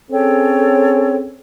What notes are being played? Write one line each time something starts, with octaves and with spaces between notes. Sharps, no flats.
C4 C#4 G#4 A4 C#5 G5